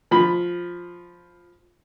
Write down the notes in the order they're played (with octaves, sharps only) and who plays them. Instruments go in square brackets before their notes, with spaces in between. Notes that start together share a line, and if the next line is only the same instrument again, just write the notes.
[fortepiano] F3 B5